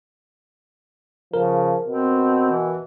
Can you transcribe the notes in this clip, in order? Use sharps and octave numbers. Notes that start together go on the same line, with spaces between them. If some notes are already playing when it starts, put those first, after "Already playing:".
C#3 F3 A#4
B2 C4
E3